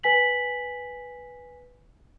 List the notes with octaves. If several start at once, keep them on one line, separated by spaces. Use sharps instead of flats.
B4 G#5 B6 F#7